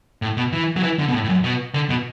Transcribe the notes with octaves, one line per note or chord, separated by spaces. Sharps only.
A2
B2
E3
F#3
E3
D3
B2
A2
A2
F#2
B2
D3
B2